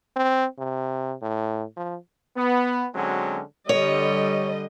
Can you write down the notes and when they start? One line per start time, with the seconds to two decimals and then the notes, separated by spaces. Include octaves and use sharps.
0.16 C4
0.58 C3
1.22 A2
1.77 F3
2.37 B3
2.95 D3 F#3 G#3 C4 C#4 F#4
3.69 D3 G3 C#5 D#5